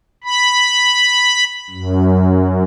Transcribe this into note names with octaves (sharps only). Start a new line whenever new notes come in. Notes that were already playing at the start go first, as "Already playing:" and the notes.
B5
F#2